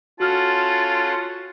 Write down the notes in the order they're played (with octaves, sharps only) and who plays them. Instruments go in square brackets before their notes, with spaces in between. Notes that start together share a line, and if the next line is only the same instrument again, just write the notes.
[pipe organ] C#4 A4 F#5 [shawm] F4 [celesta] F#4 F6 [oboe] A5